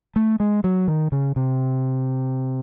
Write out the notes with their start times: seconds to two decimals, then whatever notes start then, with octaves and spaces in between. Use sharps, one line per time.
0.16 A3
0.40 G#3
0.64 F#3
0.88 D#3
1.12 C#3
1.36 C3